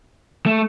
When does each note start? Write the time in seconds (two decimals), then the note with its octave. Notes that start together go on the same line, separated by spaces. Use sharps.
0.46 A3